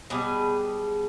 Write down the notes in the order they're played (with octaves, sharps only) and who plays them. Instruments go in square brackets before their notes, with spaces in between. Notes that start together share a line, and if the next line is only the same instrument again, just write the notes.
[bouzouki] B2 G3 G#4